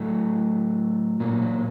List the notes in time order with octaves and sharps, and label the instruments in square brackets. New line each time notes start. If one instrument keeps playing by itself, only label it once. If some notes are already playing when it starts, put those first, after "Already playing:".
Already playing: [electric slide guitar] A2 F#3 A3
A#2 F#3 A#3
A#3